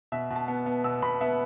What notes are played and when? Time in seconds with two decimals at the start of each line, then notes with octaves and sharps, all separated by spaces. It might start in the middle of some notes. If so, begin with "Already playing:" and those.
0.12 B2 E5
0.30 B2
0.36 A5
0.48 B3
0.66 B3
0.84 B2 E6
1.02 B2 B5
1.21 B3 E5